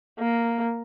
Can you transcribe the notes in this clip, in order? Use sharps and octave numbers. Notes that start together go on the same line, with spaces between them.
A#3